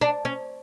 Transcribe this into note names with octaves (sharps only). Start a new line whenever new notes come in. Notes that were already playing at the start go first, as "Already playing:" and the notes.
D4
C#4